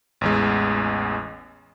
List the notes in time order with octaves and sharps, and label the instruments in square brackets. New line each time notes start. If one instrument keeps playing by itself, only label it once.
[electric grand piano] A1 E2 G#3